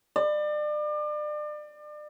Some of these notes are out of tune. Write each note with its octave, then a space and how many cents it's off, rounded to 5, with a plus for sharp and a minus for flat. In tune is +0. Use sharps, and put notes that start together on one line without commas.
D5 +35